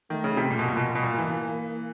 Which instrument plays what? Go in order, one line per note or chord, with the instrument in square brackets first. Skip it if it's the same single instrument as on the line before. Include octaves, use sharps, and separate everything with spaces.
[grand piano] D#3 [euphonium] A3
[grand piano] C#3
C3
A#2
B2
[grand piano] A#2 [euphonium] A#3
[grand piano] B2
A#2
B2
A#2
E3